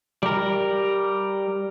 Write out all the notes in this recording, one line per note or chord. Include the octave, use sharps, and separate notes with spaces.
G3 A#4